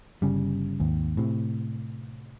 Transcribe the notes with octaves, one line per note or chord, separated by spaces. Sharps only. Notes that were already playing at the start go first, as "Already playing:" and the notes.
G1 C#3 G3
G#1 D#2
A2 C3